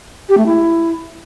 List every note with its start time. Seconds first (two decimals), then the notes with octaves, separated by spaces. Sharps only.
0.29 G4
0.38 A3
0.46 E4